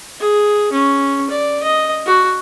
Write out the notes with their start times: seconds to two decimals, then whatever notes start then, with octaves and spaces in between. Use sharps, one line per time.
0.20 G#4
0.72 C#4
1.30 D5
1.63 D#5
2.06 F#4